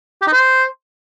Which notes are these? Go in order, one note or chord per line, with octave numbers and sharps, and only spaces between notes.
G4
D#4
C5